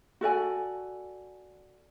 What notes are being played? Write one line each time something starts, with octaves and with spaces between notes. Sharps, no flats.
F#4 A4 D5 G#5